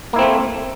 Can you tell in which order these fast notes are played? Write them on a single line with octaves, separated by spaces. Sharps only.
A#3 E4 C4 A3